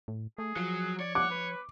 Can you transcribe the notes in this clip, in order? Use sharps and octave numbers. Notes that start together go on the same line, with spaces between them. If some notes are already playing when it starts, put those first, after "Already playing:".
A2
A3 G#4
F3 F#3
C#5 D5
F#5 D6
B4